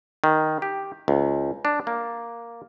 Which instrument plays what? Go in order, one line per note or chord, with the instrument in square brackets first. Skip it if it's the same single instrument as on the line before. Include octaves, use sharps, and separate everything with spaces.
[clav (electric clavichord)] D#3
G4
C#2
D4
A#3